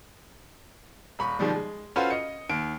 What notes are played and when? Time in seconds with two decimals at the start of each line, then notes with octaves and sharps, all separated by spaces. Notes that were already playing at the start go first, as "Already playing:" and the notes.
1.19 D#1 B5 C#6
1.39 B2 D#3 F3 G3 G#3
1.55 G#3
1.96 C#4 F4 F#4 A4 B4 C5
2.11 D#5 C#7
2.49 D#2 D7